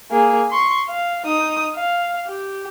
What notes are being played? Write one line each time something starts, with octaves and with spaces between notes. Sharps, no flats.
A#3 G#4
C6 C#6
F5
D#4 D#6
F5
G4